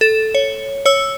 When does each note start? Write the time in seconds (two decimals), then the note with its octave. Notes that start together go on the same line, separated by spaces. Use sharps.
0.01 A4 E7
0.35 C#5
0.86 C#5 E6